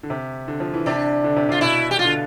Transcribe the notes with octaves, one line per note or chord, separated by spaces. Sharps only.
D3
C3
D3
F3
E3
C3 D4
D3
C3
C3 F4
B2 E4
G4
F4
D3